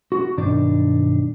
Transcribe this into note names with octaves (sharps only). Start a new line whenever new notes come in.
F#4
B1 G2 D#3 D4 D5